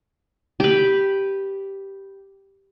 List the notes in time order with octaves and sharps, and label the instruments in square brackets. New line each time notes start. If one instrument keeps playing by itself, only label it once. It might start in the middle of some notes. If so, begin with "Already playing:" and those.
[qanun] G4 B4